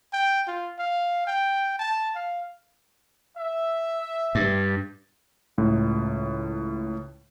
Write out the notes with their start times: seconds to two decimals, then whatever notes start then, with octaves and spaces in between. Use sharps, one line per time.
0.13 G5
0.48 F4
0.79 F5
1.27 G5
1.79 A5
2.15 F5
3.37 E5
4.35 G2
5.58 C#2 A2